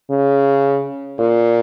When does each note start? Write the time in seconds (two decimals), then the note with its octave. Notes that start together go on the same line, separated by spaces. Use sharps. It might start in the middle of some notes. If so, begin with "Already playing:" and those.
0.11 C#3
1.19 A#2